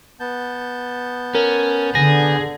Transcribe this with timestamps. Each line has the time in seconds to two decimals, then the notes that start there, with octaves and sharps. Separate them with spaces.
0.20 B3 A5 G6
1.35 C#4 A#4
1.95 D3 G#4 A#6